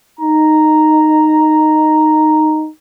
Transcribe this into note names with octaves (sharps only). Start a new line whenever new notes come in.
D#4 A#5